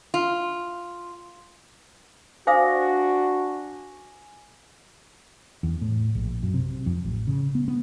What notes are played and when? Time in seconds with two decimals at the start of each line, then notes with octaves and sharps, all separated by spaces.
0.14 F4
2.47 D4 F#4 C5 F5 G#5 D6 D#6 A#6
5.63 E2
5.81 A2
6.15 A#1
6.43 F#2
6.54 C3
6.86 F2
7.05 A1
7.27 C#3
7.55 B3
7.68 B3